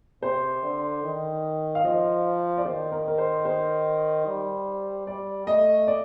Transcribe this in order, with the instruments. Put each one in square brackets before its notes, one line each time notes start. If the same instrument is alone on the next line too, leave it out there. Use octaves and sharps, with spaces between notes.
[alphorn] C3 [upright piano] C5
[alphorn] D3
D#3
[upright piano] F5
[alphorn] F3 [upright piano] D#5
[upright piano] D5
[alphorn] D#3 [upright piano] C5
[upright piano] A#4
A#4
C5
C5
[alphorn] G3
[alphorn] G3 [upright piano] D5
[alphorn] A3 [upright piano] D#5
[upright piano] D5